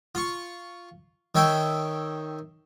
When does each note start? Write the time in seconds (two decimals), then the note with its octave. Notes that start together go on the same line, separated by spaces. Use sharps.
0.15 F4 C#6
1.35 D#3 C#5 E5 G5